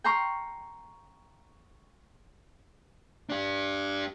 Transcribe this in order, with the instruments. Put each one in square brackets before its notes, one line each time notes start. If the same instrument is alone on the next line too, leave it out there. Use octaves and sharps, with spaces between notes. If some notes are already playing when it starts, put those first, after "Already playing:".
[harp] G5 A#5 C6 C#6 F6
[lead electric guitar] D4 G4